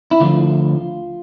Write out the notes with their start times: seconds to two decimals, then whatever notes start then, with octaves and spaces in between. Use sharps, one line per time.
0.11 E4
0.20 D2 D3 F3 F4